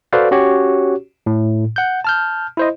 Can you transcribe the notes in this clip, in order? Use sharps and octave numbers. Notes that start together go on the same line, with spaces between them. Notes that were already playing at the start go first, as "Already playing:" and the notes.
F#4 A4 B4 C5 D5 F5
C#4 F#4 G4 C#5
A2
F#5 G6
A5 F6 G6
E4 C5 D#5